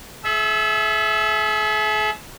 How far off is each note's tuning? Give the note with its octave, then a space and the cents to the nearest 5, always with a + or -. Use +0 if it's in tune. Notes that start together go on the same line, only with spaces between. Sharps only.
G#4 +45 E5 +0